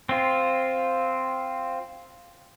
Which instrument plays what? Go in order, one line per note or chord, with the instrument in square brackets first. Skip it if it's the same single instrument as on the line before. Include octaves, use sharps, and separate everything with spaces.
[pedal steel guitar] C4 F4